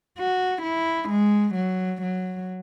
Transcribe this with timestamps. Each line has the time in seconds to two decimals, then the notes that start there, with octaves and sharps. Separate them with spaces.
0.18 F#4
0.64 E4
1.10 G#3
1.56 F#3
2.02 F#3